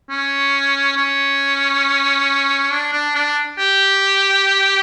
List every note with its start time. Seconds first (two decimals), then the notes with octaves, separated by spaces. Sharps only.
0.10 C#4
0.97 C#4
2.72 D4
2.93 D4
3.15 D4
3.58 G4